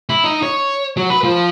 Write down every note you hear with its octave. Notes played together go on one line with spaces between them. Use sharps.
E4
D#4
C#5
F#3
B4
F3